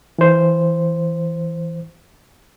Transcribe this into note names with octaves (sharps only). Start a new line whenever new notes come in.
E3 C5